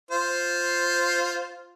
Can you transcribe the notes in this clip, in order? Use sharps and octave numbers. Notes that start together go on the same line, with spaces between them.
F4 C5